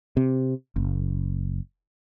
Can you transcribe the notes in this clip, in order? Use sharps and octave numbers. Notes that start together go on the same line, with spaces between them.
C3
F#1